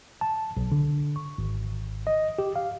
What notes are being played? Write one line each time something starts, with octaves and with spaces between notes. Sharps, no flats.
A5
B1
D3
C#6
G#1
D#5
G4
F5